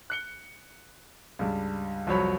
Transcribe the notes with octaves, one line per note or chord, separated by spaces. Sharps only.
F#6 C#7 G7
C#2 G2
C2 F2 F#3 C#5 B5